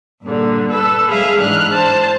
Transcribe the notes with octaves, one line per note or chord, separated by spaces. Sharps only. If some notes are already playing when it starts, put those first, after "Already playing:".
G2 A#2 D3
A4 B4 E6
F#3 G#3 G#4 E5 F5
G#2 E3 D4 F6 F#6
C5 A5